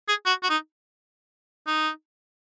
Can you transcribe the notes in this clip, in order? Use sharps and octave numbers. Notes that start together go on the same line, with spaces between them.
G#4
F#4
F#4
D#4
D#4